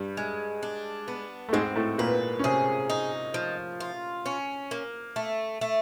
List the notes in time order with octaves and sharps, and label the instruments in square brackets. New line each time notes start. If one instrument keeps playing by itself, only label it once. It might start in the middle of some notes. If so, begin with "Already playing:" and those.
Already playing: [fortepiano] G2 G3
[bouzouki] G#3
D4
B3
[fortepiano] A3
[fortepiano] G#2 G#3 [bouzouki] C4
[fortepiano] A2 A3
[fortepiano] A#2 A#3 [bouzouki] B4
[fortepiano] C#4
[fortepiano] C3 C4 [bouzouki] G#4
[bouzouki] D#4
F3
F4
C#4
A#3
A3
A3